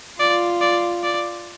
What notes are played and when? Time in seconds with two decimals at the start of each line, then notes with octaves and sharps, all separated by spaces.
0.19 F4 D5
0.61 D5
1.03 D5